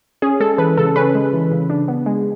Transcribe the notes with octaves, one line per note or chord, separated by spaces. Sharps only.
C#4 G#4
G#3 A4
E3 B4
C#3 A4
C#4 B4
G#3
E3
C#3
D4
B3
G#3